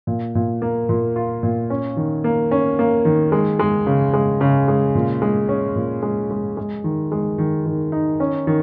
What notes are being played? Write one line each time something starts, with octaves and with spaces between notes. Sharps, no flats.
A#2
A#2
A#3
A#2
F4
A#2
C#4
D#3
A#3
C#4
A#3
D#3
G#3
G#3
C#3
G#3
C#3
G#3
A#2
G#3
C#4
A#2
G#3
G#3
G#3
D#3
G#3
D#3
D#3
D#4
C#4
D#3